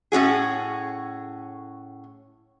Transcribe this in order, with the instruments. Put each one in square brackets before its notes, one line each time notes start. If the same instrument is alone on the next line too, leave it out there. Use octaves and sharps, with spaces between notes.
[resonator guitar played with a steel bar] A2 C#4 F#4 G#4